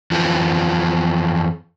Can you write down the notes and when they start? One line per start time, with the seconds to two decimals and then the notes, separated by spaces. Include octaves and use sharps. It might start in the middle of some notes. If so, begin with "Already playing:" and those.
0.11 F2 E3 F3